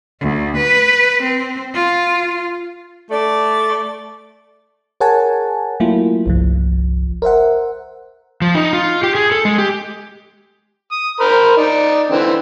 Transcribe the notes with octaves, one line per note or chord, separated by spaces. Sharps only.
D2
B4
C4
F4
A3 D5
G#4 A#4 C#5 F#5 G#5 A5
F#3 A3 A#3 E4 F4
G1 C2 F3
A#4 C5 E5 F#5
F3
D#4
F4
G4
G#4
A4
G#3
G4
D#6
A#4 C5 B5
D#4 D5
D3 E3 C4